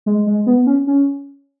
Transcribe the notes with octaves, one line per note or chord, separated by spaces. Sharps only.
G#3
G#3
B3
B3
C#4
C#4